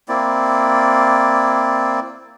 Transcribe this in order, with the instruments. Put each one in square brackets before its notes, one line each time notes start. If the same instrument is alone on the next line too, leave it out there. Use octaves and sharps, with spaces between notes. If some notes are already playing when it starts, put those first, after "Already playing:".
[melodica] A#3 C4 E4 D5